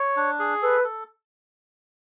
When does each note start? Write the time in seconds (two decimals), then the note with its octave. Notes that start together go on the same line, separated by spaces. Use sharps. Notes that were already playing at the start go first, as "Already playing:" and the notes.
Already playing: C#5
0.17 D4
0.39 G#4
0.62 A4 B4
0.84 A4